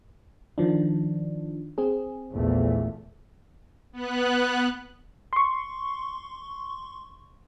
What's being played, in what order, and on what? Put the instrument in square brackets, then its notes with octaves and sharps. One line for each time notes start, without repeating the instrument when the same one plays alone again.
[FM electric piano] D#3 F3 D4
C4 G#4
[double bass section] A#1 E2 A3
[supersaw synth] B3 F#6
[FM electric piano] C6 C#6